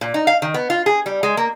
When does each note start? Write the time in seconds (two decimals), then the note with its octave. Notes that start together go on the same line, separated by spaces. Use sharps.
0.01 A#2
0.14 D#4
0.27 F5
0.42 D#3
0.54 B3
0.70 F4
0.86 G#4
1.06 G3
1.23 G#3
1.37 A#3